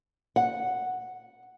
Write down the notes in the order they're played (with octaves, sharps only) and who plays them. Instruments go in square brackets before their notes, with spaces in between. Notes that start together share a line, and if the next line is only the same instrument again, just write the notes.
[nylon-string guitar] F#5